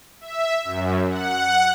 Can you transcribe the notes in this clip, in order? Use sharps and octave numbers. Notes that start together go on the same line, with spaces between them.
E5
F#2
F#5